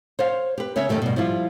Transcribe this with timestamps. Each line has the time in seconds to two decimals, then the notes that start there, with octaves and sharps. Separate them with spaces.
0.19 C5 C#5 F5
0.58 G4 B4
0.76 C#3 C#4 C#5 E5
0.89 F#2 A#2 D#3 A3 G4
1.02 G2 B2
1.16 F3 G3 E4 F4